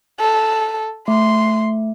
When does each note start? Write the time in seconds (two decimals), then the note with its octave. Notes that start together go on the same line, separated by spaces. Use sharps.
0.20 A4
1.08 A3 C6